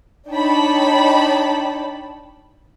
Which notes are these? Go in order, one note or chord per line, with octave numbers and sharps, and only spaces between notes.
D4 D#4 C#5 G5 A5 B5